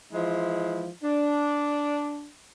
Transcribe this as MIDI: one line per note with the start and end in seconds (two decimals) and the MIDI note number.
0.13 0.89 52
0.13 0.89 53
0.13 0.89 56
0.13 0.89 64
1.04 2.30 62